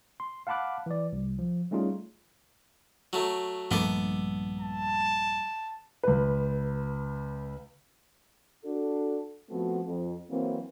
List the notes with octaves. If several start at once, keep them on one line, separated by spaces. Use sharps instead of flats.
C6
F5 F#5 A5 B5 D6 F#6
E3 D5
C2
F3
G3 A3 C#4 D#4 F4 G#4
F#3 A3
A#1 G2 A3 B3 A4 D6
A5
C#2 B4
D4 F#4 A4
F3 A3 B3 C4 F#4
F2
E3 F#3 A#3 C4